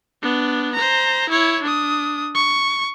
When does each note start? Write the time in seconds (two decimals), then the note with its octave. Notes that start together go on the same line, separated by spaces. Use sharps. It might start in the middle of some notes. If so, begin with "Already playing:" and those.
0.22 B3 D4
0.75 C5 A#5
1.30 E4 C#5
1.63 D4 D#6
2.35 C#6